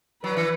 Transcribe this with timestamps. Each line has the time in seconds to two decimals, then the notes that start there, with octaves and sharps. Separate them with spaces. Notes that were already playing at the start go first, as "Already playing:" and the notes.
0.23 F#3 B4
0.37 E3